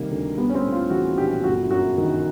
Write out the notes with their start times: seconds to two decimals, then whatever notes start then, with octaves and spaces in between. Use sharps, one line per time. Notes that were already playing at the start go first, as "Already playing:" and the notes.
Already playing: C3 D#3 G3 A#3
0.11 D2
0.37 G3 B3
0.49 C#4
0.55 C4
0.64 A2
0.72 F4
0.90 E3 F#4
1.17 A#1 G4
1.44 G1 F#4
1.70 F#2 F#4
1.98 D#3